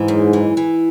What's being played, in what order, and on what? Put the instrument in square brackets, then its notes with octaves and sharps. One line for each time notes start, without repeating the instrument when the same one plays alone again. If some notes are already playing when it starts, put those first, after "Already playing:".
Already playing: [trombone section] G#2 [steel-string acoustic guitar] E3
[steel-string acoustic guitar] F#2
E3
E3